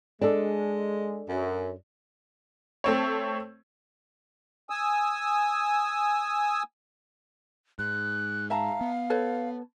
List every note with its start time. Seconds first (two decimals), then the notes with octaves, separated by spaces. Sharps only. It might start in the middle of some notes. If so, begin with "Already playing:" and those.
0.21 G#3 D4 A4
1.29 F#2
2.84 A3 C4 C#5
4.70 G#5 D#6 E6
7.79 G#2 F#6
8.50 E5 F5 A5 A#5
8.81 B3
9.10 A4 B4 C#5